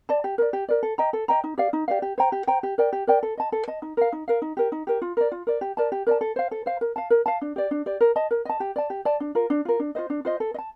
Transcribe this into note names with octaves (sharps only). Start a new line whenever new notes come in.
D5 A5
G4
A#4 D5
G4
A#4 D5
A4
D#5 G5 A#5
A4
D#5 G5 A#5
D#4
G4 D5 F5
D#4
G4 D5 F5
G4
C5 G5 A#5
G4
C5 G5 A#5
G4
A#4 D5 G5
G4
A#4 D5 G5
A4
D#5 A5
A4
D#5 A5
D#4
A#4 F5
D#4
A#4 F5
D#4
G4 A#4
D#4
G4 A#4
F4
A#4 D5
F4
A#4 D5
G4
A#4 D5 A5
G4
A#4 D5 A5
A4
C5 F5
A4
C5 F5
A#4
F5 A5
A#4
F5 A5
D4
G4 D5
D4
G4 D5
A#4
D#5 A5
A#4
D#5 A5
G4
D5 A5
G4
D5 A5
D4
F4 A#4
D4
F4 A#4
D4
F4 C5 D#5
D4
F4 C5 D#5
A4
D#5
A5